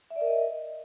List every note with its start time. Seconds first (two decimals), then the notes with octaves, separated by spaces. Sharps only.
0.10 E5
0.16 D5
0.21 A#4
0.26 D#5